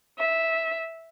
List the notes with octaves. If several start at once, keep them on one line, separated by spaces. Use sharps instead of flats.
E5